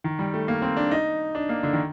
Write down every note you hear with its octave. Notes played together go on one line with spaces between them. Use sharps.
D#3
G3
A3
A#3
C4
D4
D#4
D4
A#3
D3
D#3